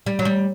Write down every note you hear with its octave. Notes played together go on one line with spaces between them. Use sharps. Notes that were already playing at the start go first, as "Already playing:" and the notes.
G3
F#3
G3